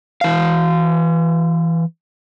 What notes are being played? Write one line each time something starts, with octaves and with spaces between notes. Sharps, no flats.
E3 F5